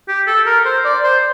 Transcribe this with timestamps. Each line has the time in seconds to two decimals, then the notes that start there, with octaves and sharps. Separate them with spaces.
0.08 G4
0.27 A4
0.46 A#4
0.65 C5
0.84 D5
1.04 C5